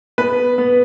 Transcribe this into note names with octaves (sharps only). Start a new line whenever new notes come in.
B3 B4
B3